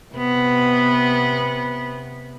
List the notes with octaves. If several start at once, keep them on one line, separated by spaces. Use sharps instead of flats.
C3 B3